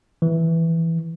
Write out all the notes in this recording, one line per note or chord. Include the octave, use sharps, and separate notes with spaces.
E3